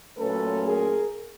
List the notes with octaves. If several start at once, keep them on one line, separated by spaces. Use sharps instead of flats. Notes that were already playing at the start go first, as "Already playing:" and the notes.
A#2 F#3 A3 C#4 A4 B4
G#4 A#4